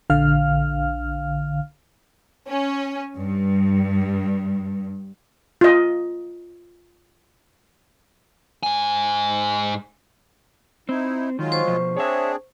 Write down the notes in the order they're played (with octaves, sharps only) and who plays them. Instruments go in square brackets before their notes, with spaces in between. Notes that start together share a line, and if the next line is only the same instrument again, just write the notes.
[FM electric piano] A#1 D3 F5 F6
[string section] C#4
G2
[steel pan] F4 D#5
[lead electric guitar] G#2 G#5
[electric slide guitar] C4 [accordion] D#4 E4
[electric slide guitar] D#3 [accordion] F#3 G#3 F4
[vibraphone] C5 C#6
[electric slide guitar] B2 F3
[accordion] C4 D4 G#4 [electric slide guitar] C#5 E5